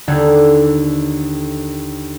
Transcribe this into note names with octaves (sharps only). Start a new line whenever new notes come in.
D#2 D3 D4 A4 G6 G#6